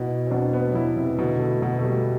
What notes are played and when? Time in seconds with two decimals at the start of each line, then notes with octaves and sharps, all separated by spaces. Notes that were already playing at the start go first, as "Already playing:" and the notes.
Already playing: B2 E4
0.27 C4
0.31 B2 D4
0.53 B3
0.69 F#3
0.74 E3 E4
0.97 C3
1.18 B2 D3
1.40 A3
1.62 B2
1.79 A3
1.84 G3